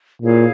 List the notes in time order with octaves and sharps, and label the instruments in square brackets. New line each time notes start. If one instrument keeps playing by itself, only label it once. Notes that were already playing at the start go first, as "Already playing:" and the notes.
[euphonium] A#2 [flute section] E4 G#4 C#5 F5